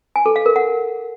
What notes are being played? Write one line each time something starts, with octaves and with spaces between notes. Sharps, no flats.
G#5
A4
F5
A#4
F#5